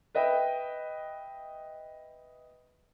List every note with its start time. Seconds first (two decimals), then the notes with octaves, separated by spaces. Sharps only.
0.15 B4 D#5 E5 G5